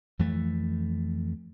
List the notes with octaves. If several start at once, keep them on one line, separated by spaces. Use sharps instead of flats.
F2 E3 A3